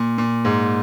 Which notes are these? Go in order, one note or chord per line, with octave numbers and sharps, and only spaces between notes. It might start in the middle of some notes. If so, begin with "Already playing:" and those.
Already playing: A#2
A#2
G#2